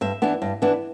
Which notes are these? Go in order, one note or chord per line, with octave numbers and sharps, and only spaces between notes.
G2 E5
E3 B3 D4
G2
E3 B3 D4